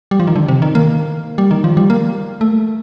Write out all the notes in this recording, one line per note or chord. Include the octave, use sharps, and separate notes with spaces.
G3
F3
D#3
D3
C3
D#3
A#3
G3
D#3
F3
G3
A#3
A3